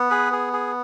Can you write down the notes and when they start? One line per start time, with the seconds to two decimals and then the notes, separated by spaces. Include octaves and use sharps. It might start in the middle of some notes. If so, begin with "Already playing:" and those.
Already playing: B3
0.10 G#4 B4
0.32 G#4
0.53 G#4